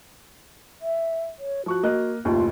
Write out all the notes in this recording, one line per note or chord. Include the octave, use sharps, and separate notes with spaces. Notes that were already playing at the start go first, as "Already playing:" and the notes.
E5
C#5
F3 F#4 C#6 F#6
A#3 D#5 F#6
F#1 D#2 A2 F4